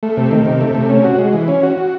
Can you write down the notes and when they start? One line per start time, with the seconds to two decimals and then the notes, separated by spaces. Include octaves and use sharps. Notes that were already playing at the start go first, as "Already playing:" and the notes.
0.03 A3
0.17 C3
0.31 D#3
0.46 C3
0.61 A3
0.75 C3
0.90 C#4
1.04 F#4
1.18 G#3
1.33 E3
1.48 C#4
1.63 F#4
1.77 F#4